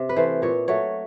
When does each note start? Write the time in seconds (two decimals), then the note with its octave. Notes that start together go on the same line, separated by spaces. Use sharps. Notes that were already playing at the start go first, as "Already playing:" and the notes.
Already playing: C3
0.09 B4
0.16 E3 A3 C5
0.42 A#2 C#5
0.68 F#3 A3 C#5